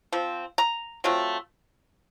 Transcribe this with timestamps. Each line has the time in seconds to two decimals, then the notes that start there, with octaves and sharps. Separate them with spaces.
0.12 F3 C4
0.58 A#5
1.04 F#3 A3 C4 F4